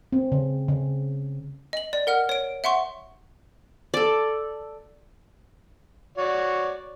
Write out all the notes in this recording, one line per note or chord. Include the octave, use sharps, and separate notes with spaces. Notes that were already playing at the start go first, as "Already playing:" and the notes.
C4
C#3
C#3
D#5 F#7
D5
A#4 F#5 F6
C#5 D7
E5 F#5 C6 C#6
A4 D5
F#4 C#5 D5